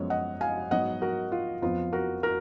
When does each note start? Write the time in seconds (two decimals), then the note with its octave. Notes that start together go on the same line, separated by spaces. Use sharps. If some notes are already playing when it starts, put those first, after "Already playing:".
Already playing: F#2 F3 G#3 B3 C#5
0.10 D#5 F#5
0.41 F5 G#5
0.71 G#2 F#3 B3 D#5 F#5
1.02 F#4 A#4
1.32 F4
1.62 F2 F3 B3 F4
1.93 F#4 A#4
2.23 F#4 A#4